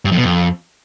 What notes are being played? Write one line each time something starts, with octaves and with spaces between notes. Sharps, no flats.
G2
F2
B2
F2